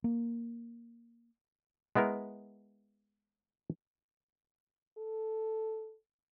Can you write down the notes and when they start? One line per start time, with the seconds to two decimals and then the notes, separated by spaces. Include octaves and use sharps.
0.04 A#3
1.95 G#3 B3 E4 A#4
4.98 A4